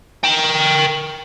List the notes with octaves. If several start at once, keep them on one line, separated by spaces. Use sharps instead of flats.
A#4 G5